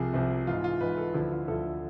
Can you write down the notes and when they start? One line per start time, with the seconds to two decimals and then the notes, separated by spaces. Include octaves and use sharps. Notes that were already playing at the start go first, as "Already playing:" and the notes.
Already playing: C2 C3 F3 G#4
0.14 C2 C3 F3
0.47 G#2 E3 F4
0.64 F4
0.81 G#2 E3 B4
0.97 A4
1.14 D2 D3 F3 E4
1.32 F4
1.48 D2 D3 F3 A4